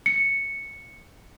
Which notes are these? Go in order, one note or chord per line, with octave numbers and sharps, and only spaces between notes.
C#7